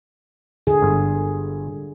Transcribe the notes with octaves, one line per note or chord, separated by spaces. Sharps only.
D3 G#4
G1